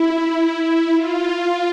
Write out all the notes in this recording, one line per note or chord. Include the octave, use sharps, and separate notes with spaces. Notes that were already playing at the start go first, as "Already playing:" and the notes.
Already playing: E4
F4